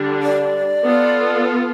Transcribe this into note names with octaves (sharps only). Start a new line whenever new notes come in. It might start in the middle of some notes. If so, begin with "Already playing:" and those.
Already playing: D3 G3 D4
D5
B3 F4 A4